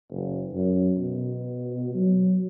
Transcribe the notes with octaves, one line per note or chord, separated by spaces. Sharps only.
F#1
F#2
B2
F#3